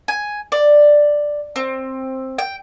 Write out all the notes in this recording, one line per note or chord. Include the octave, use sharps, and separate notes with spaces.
G#5
D5
C4
G5